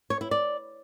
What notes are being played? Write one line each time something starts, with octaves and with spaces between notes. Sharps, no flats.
C#5
E4
D5